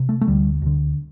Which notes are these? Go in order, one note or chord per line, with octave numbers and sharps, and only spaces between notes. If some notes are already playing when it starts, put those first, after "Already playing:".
Already playing: C3
A3
A3
D2 D3 G3
D2 D3